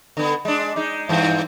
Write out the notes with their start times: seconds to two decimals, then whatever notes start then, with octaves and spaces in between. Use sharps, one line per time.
0.17 D3 B3
0.45 G#3 D4
0.76 G#3 D#4
1.09 G2 E3 C4